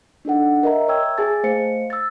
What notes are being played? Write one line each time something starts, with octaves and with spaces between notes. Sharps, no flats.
D4 D#4 A4 F#5
A#4 D#5 E5 A#5
C#5 E5 G5 E6 G#6
G#4 G#5 A5 A6
A3 C5 F5 C#7
E6 A6